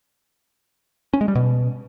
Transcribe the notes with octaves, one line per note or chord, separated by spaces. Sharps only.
C#4
G#3
G3
B2